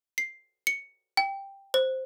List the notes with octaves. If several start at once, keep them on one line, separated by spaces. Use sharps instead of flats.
C7
C#7
G5
C5